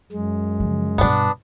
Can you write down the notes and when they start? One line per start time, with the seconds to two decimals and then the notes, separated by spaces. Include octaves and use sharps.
0.12 F#2 G#3
0.60 C#3 F3
0.98 G2 B2 B3 D4